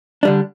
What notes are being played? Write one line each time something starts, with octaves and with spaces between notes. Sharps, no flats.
D3 G3 D4